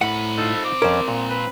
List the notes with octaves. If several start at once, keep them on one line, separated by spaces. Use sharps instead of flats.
A2 C4 F#5 B5
D#4 F4 A4
D6
F2 C#4 A#4 C5
A#2
B4